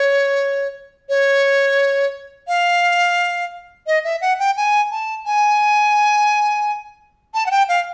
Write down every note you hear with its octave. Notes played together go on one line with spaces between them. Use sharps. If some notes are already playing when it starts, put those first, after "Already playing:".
Already playing: C#5
C#5
F5
D#5
E5
F#5
G5
G#5
A5
G#5
A5
F#5
G5
F5